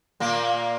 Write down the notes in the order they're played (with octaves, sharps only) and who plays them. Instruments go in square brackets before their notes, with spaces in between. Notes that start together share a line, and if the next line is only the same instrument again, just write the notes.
[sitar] A#2 A#3